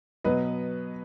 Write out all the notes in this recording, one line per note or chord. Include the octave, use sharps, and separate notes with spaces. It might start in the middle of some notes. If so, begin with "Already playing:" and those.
B2 F#3 B3 B4 D#5